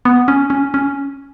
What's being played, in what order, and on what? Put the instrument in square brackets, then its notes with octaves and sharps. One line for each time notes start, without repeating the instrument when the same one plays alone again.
[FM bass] B3
C#4
C#4
C#4